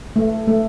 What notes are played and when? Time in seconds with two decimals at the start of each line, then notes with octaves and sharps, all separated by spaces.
0.16 A3
0.47 A3